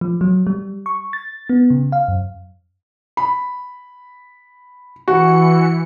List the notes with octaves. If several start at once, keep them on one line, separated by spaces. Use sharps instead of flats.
F3
F#3
G3
C#6
A6
B3
C#3
F5
F#2
B5
E3 F#4 C#7